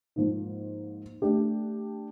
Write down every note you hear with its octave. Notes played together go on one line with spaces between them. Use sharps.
G#2 F3 A#3 D#4
A3 D4 G4